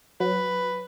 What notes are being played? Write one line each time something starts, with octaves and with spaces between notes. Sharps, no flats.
F#3 B4